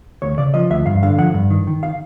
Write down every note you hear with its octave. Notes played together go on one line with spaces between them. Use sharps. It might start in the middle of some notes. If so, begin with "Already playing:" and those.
D2 C#5
C#3 D5
F3 D#5
D2 E5
G2 F5
D3 F5
F3 F#5
G2
D#3
D#3
F5